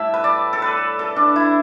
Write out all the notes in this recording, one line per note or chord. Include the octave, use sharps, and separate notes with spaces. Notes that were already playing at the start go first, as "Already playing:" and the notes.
Already playing: A2 G3 E5 A5
B4
D5
A4
B4
A4
D4
E4